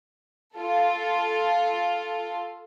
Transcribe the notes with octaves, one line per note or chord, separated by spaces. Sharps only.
F4 A4